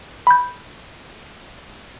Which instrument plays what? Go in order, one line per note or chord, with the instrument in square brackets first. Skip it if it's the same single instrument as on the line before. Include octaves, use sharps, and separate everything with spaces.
[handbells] B5 G6